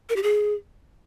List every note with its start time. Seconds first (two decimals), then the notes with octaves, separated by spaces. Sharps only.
0.09 A#4
0.16 G4
0.23 G#4